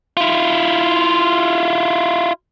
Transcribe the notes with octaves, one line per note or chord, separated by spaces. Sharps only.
E4 F4